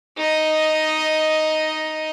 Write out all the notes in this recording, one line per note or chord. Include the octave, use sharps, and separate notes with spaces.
D#4 D#5